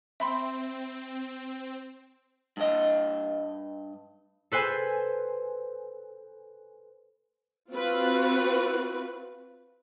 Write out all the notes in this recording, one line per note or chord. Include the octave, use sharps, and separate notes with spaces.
C4 E5 B5 C6
G2 D#5
A4 B4 C5 G#5 F#6
C4 F4 F#4 B4